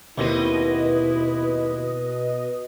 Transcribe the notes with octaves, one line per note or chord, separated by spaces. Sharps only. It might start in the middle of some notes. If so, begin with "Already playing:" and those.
D#2 B2 C4 E4 B4 D#5